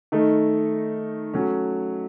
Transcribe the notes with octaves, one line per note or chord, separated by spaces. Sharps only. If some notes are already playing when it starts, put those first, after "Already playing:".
D#3 A3 D#4
F#3 A3 C#4